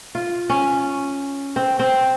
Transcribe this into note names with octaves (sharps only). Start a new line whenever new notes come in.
F4
C#4
C4
C4